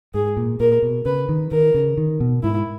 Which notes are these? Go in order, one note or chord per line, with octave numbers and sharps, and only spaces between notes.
G#2 G#4
A#2
A#2 A#4
B2
C#3 B4
D#3
D#3 A#4
C#3
D#3
B2
G#2 E4